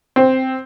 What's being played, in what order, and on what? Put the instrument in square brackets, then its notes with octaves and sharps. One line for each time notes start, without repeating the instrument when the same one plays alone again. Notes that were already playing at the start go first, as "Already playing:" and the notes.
[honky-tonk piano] C4